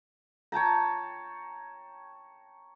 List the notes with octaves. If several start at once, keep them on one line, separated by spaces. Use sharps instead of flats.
C#5 G5 A5 A#5